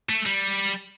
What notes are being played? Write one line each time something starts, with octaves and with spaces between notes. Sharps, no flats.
A3
G3